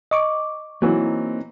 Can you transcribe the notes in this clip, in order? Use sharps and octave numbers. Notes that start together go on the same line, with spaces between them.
D#5 C#6 D6
E3 F#3 A#3 C4 D#4